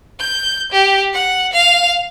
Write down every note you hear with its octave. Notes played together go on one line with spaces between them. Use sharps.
G6
G4
F#5
F5